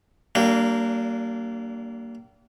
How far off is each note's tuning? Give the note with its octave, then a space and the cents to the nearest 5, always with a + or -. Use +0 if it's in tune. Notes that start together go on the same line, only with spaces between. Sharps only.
G3 -40 A#3 -15 D4 +0